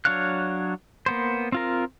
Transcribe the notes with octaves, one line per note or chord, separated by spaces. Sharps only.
F#3 D4 C#5 F5 F#6
A#3 B3 C5
C4 F4 A#4